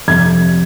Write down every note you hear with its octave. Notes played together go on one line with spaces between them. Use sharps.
F2 C3 F3 G#6